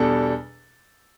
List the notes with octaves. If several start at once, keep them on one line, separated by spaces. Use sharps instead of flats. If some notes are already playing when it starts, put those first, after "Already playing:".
Already playing: E2 B2 G3 D4 A4